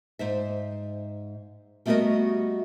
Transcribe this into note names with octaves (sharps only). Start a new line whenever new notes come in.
G#2 C5 E5
G3 A3 B3 F#4 A#4 D#5